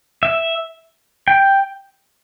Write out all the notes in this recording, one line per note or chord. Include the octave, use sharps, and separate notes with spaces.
E5
G5